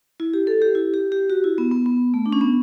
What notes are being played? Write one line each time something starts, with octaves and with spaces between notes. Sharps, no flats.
E4
G4
A4
G4
E4
G4
G4
F#4
E4
B3
B3
B3
A3
D4
C#4
B3